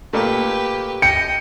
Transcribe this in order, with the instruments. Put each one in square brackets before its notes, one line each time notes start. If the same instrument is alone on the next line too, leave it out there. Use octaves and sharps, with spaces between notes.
[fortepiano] A#2 A3 [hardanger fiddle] G4 B4
[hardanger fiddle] D#5 [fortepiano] G5 [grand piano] C#7